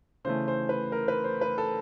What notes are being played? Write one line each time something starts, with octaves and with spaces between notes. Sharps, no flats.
C#3 E3 A3 C5
C5
B4
A#4
B4
C5
B4
A4